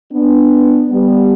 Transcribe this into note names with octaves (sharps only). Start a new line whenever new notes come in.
B3 D4
G3 B3